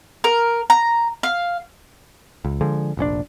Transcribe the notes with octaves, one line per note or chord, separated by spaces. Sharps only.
A#4
A#5
F5
C#2
D3 F3 G#3
F1 A#1 C#4 D4